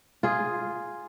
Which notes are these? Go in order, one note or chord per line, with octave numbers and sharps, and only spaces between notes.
F4 G#4